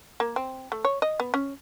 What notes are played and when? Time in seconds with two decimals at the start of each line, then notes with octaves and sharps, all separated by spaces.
0.20 A#3
0.36 C4
0.72 A3
0.85 C#5
1.02 D#5
1.20 B3
1.34 C#4